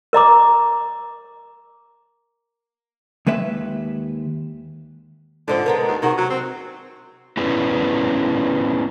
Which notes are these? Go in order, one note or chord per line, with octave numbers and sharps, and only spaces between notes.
A#4 D#5 A#5 D6
D#2 G#3 B4 E5
G#2 D3 F3 C4
G#3 B3 A#4
D#2
C3 D#3 F#4 G#4
F#3
C4
B3 C#4 D4 E4 G#4 B4